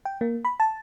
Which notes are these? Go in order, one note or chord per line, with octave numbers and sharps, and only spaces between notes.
G5
A#3
B5
A5